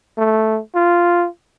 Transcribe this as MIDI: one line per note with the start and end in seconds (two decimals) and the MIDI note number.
0.18 0.60 57
0.75 1.27 65